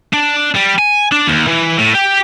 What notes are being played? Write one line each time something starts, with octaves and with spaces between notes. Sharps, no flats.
D4
G3
G#5
D4
D#2
E3
A2
G4